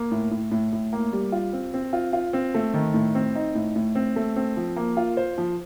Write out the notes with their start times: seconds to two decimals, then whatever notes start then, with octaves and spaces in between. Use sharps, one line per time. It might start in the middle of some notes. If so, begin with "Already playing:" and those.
Already playing: A#3
0.11 A2
0.31 A2
0.51 A2
0.73 A2
0.93 A#3
1.13 G3
1.32 F4
1.53 C4
1.74 C4
1.93 F4
2.13 F4
2.33 C4
2.54 A3
2.74 D#3
2.94 A2
3.15 C4
3.35 D#4
3.55 A2
3.76 A2
3.95 C4
4.16 A3
4.36 C4
4.57 F3
4.76 A#3
4.97 F4
5.17 C5
5.38 F3